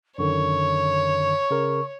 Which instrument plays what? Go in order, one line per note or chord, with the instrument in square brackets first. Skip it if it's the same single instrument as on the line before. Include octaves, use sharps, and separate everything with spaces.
[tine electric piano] F#2 D3 D#3 [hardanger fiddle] C#5 [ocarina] C#6
[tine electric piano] C#3 A#4